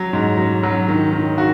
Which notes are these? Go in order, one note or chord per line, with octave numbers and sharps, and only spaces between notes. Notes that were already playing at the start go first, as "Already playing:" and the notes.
Already playing: F#3
G#2
F#3
F#3
D#3
D#3
D#3 F#4